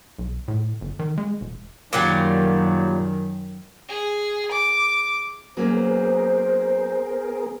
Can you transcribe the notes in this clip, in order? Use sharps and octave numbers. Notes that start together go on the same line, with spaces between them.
B1
A2
G1
D#3
G#3
E1
F#2 A#2 D#3 F#3 G3
G#4
D6
F#3 A#3 B3 C#4 G#4 A#4 C5